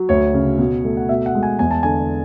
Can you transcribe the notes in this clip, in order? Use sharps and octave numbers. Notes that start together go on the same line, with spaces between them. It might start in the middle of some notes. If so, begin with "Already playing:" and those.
Already playing: F#3
D2 C#5
C#3
B2
A3
F#5
B2 E5
F#5
G#3
G#5
E2 G#5
A5
D3 G#5